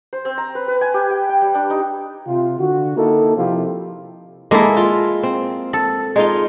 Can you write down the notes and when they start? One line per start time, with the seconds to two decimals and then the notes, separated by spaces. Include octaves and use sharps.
0.13 C5
0.25 C4
0.38 A#5
0.55 B4
0.68 B4
0.81 G#5
0.94 G4
1.10 G5
1.29 G5
1.41 G3
1.54 D4
1.70 D#4
2.27 C3 F4
2.59 D3 F#4
2.97 A#3 D#4 E4 A4
3.36 C3 F3 C4 E4 F4 G4
4.51 G#3 A#3 E4 A4 A#4
4.77 F4
5.23 C4
5.73 A4
6.16 G#3 D#4 F4